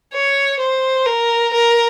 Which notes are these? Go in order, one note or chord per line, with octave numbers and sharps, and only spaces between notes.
C#5
C5
A#4
A#4